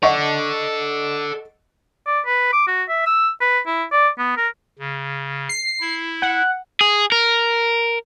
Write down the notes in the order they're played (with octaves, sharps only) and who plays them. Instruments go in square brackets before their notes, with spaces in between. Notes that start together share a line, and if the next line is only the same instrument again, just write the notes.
[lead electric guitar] A4 D5 [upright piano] D#5 F#5 C#6
[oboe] D5
B4
D6
F#4
E5
E6
B4
E4
D5
B3
A#4
[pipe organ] C#3
[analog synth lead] C7
[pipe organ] E4
[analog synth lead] F#5
[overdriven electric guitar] G#4
A#4